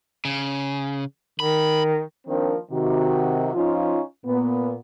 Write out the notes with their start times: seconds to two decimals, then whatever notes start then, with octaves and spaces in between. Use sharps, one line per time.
0.25 C#3
1.40 D#3 B5
2.27 D#3 F3 A#3 C4 D4 A#4
2.71 C3 D#3 F#4
3.54 F3 C#4 D#4 F4
4.26 A#2 B3